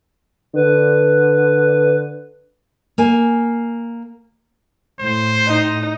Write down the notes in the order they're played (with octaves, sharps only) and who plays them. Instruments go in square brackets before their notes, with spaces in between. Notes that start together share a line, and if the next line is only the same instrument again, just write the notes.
[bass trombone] D3 [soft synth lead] B4
[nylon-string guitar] A#3 G#5
[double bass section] A2 [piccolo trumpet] C5
[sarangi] D#4